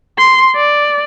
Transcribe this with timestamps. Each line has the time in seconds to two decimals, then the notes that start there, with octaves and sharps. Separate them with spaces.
0.19 C6
0.56 D5